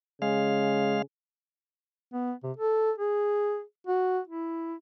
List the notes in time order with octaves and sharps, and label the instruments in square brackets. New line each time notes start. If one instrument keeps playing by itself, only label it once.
[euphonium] C#3 [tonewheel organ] G#3 F5
[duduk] B3
C3
A4
G#4
F#4
E4